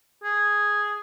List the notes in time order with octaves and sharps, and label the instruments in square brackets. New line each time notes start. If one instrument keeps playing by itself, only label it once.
[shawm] G#4